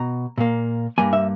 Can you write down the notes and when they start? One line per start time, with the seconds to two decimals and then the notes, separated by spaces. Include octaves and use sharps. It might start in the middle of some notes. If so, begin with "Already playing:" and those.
Already playing: B2 A#5
0.38 A#2 A#3
0.98 G2 G3 A#3 G#5
1.13 E5